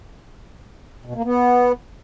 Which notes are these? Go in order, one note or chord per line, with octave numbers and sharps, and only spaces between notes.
B2
A#3
B3